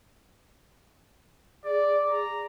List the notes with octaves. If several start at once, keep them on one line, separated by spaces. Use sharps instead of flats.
G#4 D5
A#5